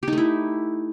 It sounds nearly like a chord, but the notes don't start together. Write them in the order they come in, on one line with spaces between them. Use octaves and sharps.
G4 D#4 A3 E4